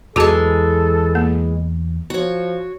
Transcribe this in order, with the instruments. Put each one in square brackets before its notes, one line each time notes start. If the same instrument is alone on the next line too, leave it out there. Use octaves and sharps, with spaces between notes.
[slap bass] E2 F#3 [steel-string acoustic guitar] E3 G#3 [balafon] F#4 G#4 A5 [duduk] A4
[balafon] A#3
[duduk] F3 [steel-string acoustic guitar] F#4 C#5